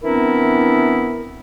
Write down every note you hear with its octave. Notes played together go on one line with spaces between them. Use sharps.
E3 B3 C4 D4 E4 A#4